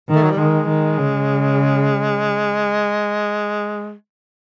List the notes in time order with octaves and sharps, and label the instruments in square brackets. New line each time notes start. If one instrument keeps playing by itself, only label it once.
[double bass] D#3
[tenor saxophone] A3
F#3
G3
[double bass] D#3 [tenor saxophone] G#3
[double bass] D#3
C#3